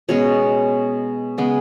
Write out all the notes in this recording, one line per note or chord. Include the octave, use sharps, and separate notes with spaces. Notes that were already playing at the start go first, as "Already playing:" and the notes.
B2 G#3 C#4 C#5
C#3 G#3 B3